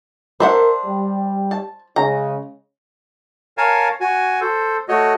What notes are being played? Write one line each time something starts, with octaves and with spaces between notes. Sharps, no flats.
D4 A#4 C5 E5 F#5
G3
A5
C#3 G#3 C#4 A#5
A#4 C#5 F5 G#5 A5
F#4 G#5
A4 C5
A3 F#4 C#5 D#5